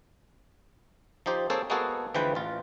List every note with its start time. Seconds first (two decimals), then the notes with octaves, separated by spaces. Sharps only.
1.26 F3 D#4 G4 C5
1.50 A#3 C4 G#4 A4 C5 C#5
1.70 G#3 A#3 B3 F#4 G#4 A4
2.14 D2 E3 F3 G#3 B4 G5
2.35 A1 F4